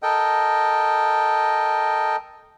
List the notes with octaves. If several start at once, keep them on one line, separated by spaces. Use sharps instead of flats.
A4 A#4 D#5 G5